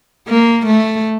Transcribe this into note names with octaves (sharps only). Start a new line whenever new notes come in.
A#3
A3